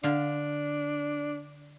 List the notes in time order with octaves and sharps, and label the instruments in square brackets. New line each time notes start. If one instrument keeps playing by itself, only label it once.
[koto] D3 F5 [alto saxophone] D4